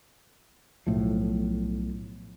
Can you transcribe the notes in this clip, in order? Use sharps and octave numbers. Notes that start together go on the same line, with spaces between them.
B1 A2 F3